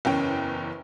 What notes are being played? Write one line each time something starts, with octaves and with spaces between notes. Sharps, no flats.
F#1 E2 C#4 G5